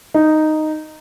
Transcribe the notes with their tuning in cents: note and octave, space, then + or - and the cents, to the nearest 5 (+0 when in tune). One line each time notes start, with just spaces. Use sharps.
D#4 -5